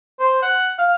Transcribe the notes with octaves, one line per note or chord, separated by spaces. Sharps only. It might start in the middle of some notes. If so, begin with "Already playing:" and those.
C5
F#5
F5